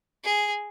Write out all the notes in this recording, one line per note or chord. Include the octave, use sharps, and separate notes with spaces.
G#4